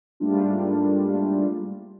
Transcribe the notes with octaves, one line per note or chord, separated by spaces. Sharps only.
G#2 G3 A3 A#3 D4 F4